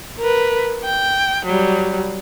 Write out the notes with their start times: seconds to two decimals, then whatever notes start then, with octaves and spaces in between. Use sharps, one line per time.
0.18 A#4 B4
0.84 G5
1.46 F#3 G3